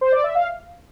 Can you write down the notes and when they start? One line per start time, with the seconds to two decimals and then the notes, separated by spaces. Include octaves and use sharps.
0.01 C5
0.12 D5
0.24 E5
0.35 F5